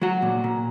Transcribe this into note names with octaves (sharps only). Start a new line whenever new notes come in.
F#3 F#4
A#2
A#2